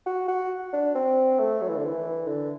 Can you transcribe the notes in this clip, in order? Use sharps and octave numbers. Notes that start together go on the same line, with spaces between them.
F#4
F#4
D4
C4
A3
F#3
E3
D3
E3
D3